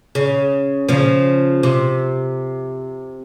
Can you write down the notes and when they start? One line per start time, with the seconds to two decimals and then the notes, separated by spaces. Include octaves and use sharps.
0.15 C#3
0.89 C#3 F3
1.63 C3